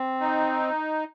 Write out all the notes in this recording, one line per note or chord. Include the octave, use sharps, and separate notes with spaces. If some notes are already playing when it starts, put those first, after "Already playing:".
Already playing: C4
D#4